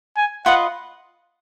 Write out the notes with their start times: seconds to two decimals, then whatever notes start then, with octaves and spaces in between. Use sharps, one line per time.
0.17 G#5
0.46 F4 B4 D#5 F#5